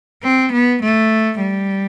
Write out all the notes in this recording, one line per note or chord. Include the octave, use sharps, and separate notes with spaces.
C4
B3
A3
G3